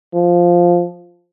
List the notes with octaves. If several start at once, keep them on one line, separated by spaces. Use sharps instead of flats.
F3